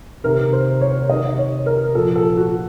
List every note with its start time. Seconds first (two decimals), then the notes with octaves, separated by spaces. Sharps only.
0.24 C3 D#3 A#4
0.53 C5
0.81 C#5
1.09 C3 D#3 D#5
1.38 C#5
1.66 A#4
1.95 A#2 F3 A4
2.16 A4
2.37 F#4